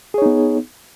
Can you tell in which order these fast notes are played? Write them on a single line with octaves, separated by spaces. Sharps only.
G#4 C#5 D#4 B3